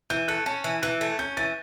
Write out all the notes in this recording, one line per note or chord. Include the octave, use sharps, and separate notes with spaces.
E3 G6
A3 F#6
C#4 A5
E3
E3 F#6
A3
C#4 G6
E3 A6